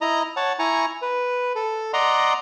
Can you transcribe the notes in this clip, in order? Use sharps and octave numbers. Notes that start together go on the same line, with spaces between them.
E4 D#5 A#5
C#5 F#5 A5
E4 G#5 A#5 C#6
B4
A4
D5 D#5 F#5 A#5 C6